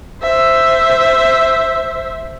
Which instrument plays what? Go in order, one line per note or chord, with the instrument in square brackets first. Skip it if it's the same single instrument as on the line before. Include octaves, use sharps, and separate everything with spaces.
[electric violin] C5 E5